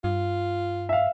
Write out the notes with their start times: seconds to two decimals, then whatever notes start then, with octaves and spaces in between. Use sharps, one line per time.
0.04 G2 F4
0.89 E5 F5